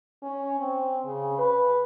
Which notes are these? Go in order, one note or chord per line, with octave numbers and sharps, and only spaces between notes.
C#4
C4
C#3
B4